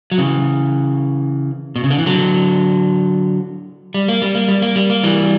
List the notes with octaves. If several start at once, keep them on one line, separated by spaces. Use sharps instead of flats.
F#3
C#3 E3
B2
C#3
D3
E3
D3 F#3
G3
A#3
G3
A#3
G3
A#3
G3
A#3
E3 G3